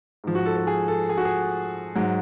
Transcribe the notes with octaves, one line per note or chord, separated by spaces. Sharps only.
G#2 F3
F#4
A4
A4
G#4
A4
G#4
F#4
G#4
G#2 F#3